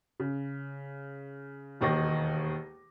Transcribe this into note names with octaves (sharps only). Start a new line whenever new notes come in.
C#3
E1 D#2 D#3 D#4 D6 A#6